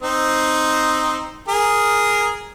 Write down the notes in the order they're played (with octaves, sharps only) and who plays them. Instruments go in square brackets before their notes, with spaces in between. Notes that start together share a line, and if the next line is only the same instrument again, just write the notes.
[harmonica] C4 D#4 C5
G#4 A#4